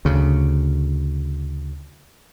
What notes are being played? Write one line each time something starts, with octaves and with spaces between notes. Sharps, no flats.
D2 C#3